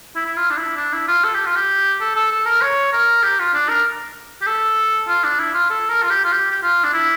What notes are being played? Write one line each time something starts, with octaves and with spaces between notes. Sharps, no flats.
E4
E4
F4
D4
E4
D4
E4
F4
A4
G4
F4
G4
A4
A4
A4
A#4
C#5
A#4
G4
F4
D4
A#4
G4
A4
F4
D4
E4
F4
A4
A#4
F4
G4
F4
G4
G4
F4
D4
E4